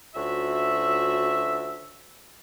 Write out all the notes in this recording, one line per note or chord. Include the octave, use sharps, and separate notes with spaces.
D2 C#4 F4 F#4 E5